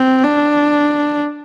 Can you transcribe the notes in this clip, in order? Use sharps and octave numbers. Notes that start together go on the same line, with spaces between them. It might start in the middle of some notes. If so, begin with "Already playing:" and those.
Already playing: C4
D4